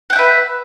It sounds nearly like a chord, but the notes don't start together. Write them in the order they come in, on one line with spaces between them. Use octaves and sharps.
F#5 G5 E5 B4